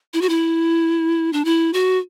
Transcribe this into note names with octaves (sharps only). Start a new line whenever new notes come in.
E4
F#4
E4
D4
E4
F#4